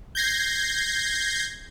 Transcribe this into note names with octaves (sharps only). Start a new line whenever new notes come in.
G6 G#6 A#6 C7